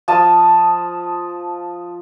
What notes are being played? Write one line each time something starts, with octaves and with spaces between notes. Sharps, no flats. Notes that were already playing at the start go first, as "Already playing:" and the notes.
F3 D#5 A5 D#6